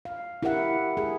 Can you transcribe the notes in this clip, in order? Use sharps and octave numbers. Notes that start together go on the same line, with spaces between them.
F5
E4 G4 A#4 E5 F#5
G#4